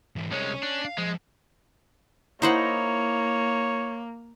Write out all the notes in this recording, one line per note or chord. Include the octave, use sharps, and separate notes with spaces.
G#2 E3
C2 G#3 C#4 C#5
D4
F5
F3 G#3 D4
A#3 D#4 E4 C5 C#5 D#5 F#5